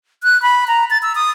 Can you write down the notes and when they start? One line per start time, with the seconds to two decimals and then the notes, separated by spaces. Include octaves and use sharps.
0.23 F#6
0.42 B5
0.68 A#5
0.90 A6
1.02 E6
1.15 D#6